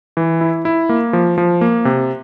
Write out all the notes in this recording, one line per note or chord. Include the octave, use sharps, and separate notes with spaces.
E3
E4
E4
A#3
F3
F3
A#3
C3